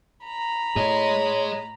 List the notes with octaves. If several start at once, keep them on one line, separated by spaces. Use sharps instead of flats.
A#5 B5
A2 G#4 C#5 D#5